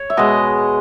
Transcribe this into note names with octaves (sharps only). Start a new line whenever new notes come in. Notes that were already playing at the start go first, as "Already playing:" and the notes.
Already playing: C#5
E5
B2 G#3 D#5